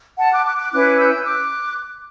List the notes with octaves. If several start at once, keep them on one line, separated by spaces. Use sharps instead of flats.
F#5 A5
D6 F#6
D6 F#6
D6 F#6
C#4 E4 B4 D6 F#6
E6 G6
D6 F#6